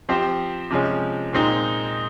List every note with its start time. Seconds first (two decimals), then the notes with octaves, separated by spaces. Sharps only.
0.09 F3 C4 G4 C5
0.70 C3 F3 G#3 C#4
1.33 A#2 G#3 C4 D#4